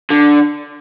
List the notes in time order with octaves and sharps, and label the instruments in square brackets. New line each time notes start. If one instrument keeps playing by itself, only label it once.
[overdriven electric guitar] D3